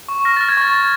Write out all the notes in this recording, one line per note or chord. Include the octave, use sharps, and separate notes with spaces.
C#6
F6 A#6
F6 A6
G#6
C#6 A6
C#6